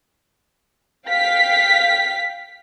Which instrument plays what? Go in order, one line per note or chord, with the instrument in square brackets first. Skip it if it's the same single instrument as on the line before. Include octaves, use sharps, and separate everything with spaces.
[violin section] F5 G5 B6